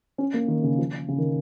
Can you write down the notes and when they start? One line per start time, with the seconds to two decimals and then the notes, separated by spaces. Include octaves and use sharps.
0.18 C#4
0.34 A#3
0.48 D#3
0.63 C#3
0.78 F3
1.08 C#3
1.18 D#3